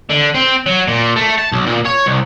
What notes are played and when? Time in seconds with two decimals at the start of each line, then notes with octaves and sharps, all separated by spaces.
0.10 D3
0.35 C4
0.66 F#3
0.88 A#2
1.16 A3
1.38 A5
1.52 B1
1.66 A#2
1.86 C#5
2.07 C2